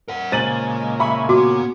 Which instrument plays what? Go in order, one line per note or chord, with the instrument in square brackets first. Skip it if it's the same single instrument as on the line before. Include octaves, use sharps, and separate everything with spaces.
[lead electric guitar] A#4 F#5
[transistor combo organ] A#2 C#3 G#5 [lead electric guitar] G#3 [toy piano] C5 [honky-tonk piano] A6 D#7 F#7
[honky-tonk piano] E5 B5 C#6
[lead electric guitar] B3 [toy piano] F#4 [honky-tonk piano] D6